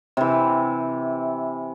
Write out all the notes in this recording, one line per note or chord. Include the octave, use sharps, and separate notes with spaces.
C3 E3